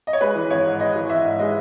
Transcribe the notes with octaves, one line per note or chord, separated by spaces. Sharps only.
D#5
C#5
G#3 B4
E3
G#1 C#5
G#2
G#3 D#5
E3
G#1 E5
G#2
G#3 D#5